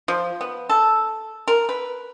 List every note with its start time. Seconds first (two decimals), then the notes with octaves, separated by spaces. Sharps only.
0.08 F3
0.41 B3
0.69 A4
1.48 A#4
1.69 B4